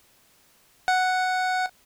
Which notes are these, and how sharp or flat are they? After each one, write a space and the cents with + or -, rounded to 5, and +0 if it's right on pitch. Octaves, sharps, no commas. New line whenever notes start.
F#5 +0